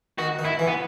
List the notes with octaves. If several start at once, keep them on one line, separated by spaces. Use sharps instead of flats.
D#3 F#4
D#3
E4
E3
B3